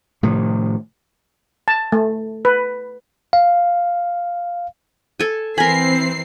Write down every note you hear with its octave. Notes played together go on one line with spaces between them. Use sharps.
A2 C3 D#3 F3
A5
A3
B4
F5
A4 G#5
E3 C4 A#4 G#5 A#5 B5 C7